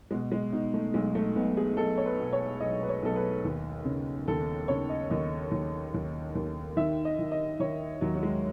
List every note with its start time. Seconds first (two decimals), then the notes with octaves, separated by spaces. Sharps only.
0.11 B2 G#3
0.32 G#3
0.52 B2 D#4
0.74 A3
0.94 B1 G#3
1.15 A3
1.35 B1 B3
1.57 G#4
1.77 B1 A4
1.97 C#5
2.06 B4
2.19 B2
2.33 C#5
2.60 B1 D#5
2.83 B4
2.89 C#5
3.02 B1 A4
3.16 B4
3.44 D#2
3.85 C#3
4.28 D#2 A4
4.68 C#3 C#5
4.89 D#5
5.10 D#2 D#5
5.51 D#2
5.94 D#2
6.35 D#2
6.77 D#3 E5
7.05 D#5
7.19 D#3
7.32 D#5
7.60 D#3 C#5
8.01 D#2 F#3
8.15 F#3
8.23 G#3